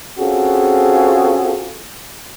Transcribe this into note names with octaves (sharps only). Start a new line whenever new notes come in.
C4 C#4 F4 F#4 G#4 A4